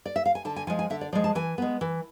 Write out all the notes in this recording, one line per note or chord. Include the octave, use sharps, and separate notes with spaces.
D5
E5
F5
G#5
D3 A5
G#5
F3 G#3 G#5
G#5
D3 E5
D5
F3 G#3 D5
A5
E3 G#5
G#3 B3
E3